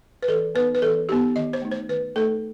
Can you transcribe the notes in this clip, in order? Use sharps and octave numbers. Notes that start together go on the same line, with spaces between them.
B4
E3 A4
B3 D#4 B4
B4
E3 A4
B3 D#4 G4
D#3 D#5
C5
A3 D#4
C5
D#3 B4
A3 D#4 A4